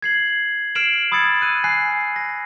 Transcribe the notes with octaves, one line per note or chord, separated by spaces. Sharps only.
G#6 C7 F#7
F6 C7 D7 E7 F#7
B5 D#6 E6 G#6 A6 C#7
F#6 D#7
G#5 F#6 C7
A#6